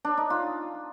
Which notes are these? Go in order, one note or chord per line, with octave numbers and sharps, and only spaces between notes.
D4
D#4
F4